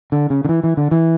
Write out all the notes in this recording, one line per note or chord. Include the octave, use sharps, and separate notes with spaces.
D3
C#3
D3
E3
E3
D3
E3